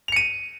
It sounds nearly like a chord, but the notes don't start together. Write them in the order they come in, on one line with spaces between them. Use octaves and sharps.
F7 C#7 D#7